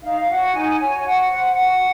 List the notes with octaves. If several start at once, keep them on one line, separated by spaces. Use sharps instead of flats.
D#4 F5
F#4 C#5 F#5
D#4 G#5
F#4 C#5 G#5
F#4 F#5
C5
F#4 F#5